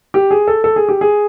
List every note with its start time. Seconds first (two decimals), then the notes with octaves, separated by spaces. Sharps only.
0.14 G4
0.31 G#4
0.48 A4
0.64 A4
0.76 G#4
0.89 G4
1.01 G#4